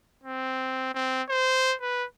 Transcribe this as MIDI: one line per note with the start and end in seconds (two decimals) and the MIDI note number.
0.24 0.93 60
0.94 1.23 60
1.29 1.75 72
1.81 2.05 71